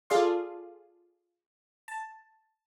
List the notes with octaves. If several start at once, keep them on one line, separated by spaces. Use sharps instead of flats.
F4 G#4 A4 D5 F5 C6
A5